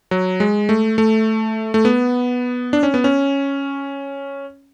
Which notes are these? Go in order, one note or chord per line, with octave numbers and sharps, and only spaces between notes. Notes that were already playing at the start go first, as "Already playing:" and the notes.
F#3
G#3
A3
A3
A3
B3
D4
C#4
B3
C#4